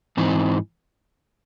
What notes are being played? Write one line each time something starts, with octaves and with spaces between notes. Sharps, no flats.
G#2 E3 C4 D#4